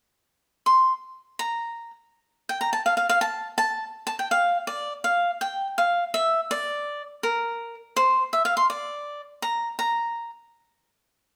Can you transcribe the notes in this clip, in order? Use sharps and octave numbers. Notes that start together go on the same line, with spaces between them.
C6
A#5
G5
A#5
A5
F5
F5
F5
A5
A5
A5
G5
F5
D5
F5
G5
F5
E5
D5
A#4
C5
E5
F5
C6
D5
A#5
A#5